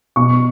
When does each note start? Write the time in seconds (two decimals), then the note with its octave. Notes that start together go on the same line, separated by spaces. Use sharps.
0.16 B2 C#6